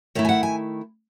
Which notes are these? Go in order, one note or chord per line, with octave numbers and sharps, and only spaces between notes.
D#3 A3 E4 C#5
G#5
F#5
G#5